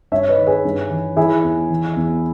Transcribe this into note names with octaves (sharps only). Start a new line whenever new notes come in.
G2 C#5 E5
B4 D#5
D#3
G#4 B4
G2
E3
E3 E4 G#4
E2
E3
E2